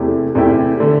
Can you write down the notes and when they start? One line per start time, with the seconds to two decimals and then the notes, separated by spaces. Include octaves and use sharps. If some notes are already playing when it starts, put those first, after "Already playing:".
Already playing: E2 C3 A3 E4 G4
0.35 E2 C3 A3 E4 G4
0.80 D3 A3